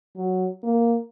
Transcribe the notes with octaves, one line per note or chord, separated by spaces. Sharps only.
F#3
A#3